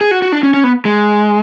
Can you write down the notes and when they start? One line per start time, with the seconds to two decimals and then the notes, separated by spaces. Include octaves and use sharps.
0.01 G#4
0.11 F#4
0.22 F#4
0.32 D4
0.43 C#4
0.54 C#4
0.64 B3
0.85 G#3